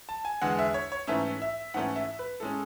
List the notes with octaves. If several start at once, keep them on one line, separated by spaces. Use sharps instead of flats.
A5
G#5
E2 D3 G#3 F#5
E5
C#5
C#5
G#2 E3 A3 C#4 E5
E5
G#2 E3 A3 C#4 F#5
E5
B4
A2 G#3 C#4 A4